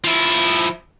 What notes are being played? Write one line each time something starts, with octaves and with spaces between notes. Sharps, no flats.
F3 E4